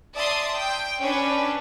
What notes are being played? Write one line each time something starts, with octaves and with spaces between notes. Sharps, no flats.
D5 E5 A5 C6 D#6
G5
C#4 D4 B4